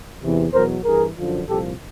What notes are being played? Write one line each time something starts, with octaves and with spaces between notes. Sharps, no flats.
E2 C3 E3
E2 B2 F#3 A#4 C5
G2 E3 G#4 A#4
F#2 D3 F3
C2 A#2 F3 G4 A4